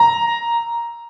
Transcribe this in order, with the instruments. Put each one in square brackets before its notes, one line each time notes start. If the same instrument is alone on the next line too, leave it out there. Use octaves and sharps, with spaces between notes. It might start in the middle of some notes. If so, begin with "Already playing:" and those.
Already playing: [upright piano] A#5